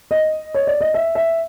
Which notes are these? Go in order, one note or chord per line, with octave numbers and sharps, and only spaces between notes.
D#5
C#5
D5
D#5
E5
E5